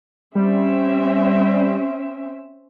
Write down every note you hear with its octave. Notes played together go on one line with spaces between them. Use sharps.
G3 C4 C#4 E5